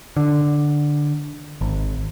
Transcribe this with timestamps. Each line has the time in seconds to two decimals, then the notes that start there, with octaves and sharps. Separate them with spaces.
0.17 D3
1.61 G#1